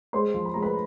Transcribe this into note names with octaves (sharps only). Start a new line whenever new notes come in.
G#3 C5 C6
F3
B5
G#3 A#5
B4 B5